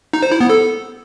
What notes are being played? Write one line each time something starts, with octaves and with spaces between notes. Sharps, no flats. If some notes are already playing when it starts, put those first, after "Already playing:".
D#4
C5
E4
B3
A4